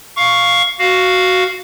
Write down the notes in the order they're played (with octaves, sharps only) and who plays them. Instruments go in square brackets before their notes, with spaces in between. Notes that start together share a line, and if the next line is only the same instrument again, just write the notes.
[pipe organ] F5 C#6
F#4 F5